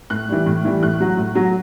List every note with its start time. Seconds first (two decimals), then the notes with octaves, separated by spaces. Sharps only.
0.10 A2 F#6
0.29 E3 G3
0.46 A2
0.65 E3 G3
0.83 A2 F#6
1.00 F#3
1.17 A2
1.35 F#3